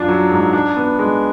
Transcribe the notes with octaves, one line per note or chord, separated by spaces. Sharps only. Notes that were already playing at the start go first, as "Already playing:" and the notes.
Already playing: F#2 D4 F4
F#3
G#2
D4
B3
G#3